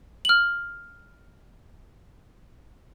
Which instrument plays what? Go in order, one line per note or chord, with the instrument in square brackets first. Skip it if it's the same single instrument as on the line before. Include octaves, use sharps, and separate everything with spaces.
[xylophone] F6 F#7